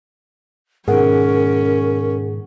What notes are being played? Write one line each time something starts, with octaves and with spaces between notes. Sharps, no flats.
G#2 B2 D#3 C#4 G#4 A#4 F#5